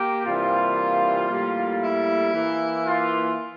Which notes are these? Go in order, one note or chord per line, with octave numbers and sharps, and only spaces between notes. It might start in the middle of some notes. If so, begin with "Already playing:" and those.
Already playing: A#3 G4
C3 E3 G3 A#3 F4
A2 G3 A#3
E4
E3 A#3
F4